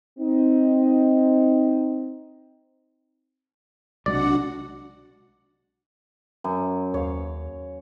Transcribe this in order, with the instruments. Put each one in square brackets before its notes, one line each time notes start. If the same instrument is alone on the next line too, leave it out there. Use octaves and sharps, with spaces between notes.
[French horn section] C4 D#4
[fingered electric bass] B1 C3 G#3 [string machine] D4 F#4 F#5 [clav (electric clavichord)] D5
[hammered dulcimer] F#2
[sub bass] D#2 [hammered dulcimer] C#5 F5